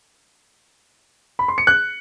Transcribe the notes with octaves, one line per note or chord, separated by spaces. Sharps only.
B5
C6
C#7
F#6